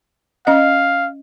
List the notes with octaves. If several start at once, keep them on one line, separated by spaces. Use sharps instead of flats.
C#4 D#5 F5